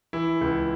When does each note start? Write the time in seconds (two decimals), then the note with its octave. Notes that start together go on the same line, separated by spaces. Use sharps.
0.13 E3 E4
0.41 C#2